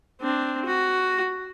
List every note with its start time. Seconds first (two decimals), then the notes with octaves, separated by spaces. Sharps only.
0.21 C4 D4
0.65 F#4